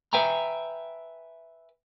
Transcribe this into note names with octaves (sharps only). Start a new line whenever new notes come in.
B4 E5 G5 G#5 A#5